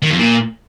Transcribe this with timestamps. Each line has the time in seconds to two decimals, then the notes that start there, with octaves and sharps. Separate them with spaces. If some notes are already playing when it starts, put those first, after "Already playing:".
0.02 D#3
0.10 F2
0.18 A#2